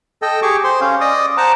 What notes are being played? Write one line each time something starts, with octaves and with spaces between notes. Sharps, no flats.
A4 D#5 G5
G4 G#4 C#6 D6
C5 C6
C#4 F5
D5 D#5 D#6
C5 F#5 A5 A#5 D6